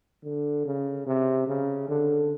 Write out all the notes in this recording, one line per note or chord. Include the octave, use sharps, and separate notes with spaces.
D3
C#3
C3
C#3
D3